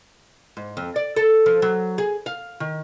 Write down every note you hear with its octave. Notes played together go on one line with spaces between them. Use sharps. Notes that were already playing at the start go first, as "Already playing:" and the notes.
G#2
F2
D5
A4
F3
F#3
G#4
F5
D#3